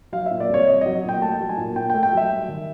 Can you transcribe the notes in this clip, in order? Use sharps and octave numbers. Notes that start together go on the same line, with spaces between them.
F#3 F5
E5
A#2
D5
C2 C#5
C2 D#5
F#3 D#5
A#2 G5
A3 A5
F#3
G#5
A#2
A#2 G5
G5
A3
G5
F#3 E5
G3
D#3